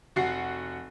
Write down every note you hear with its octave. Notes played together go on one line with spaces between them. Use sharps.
F1 F#4 F#5 C7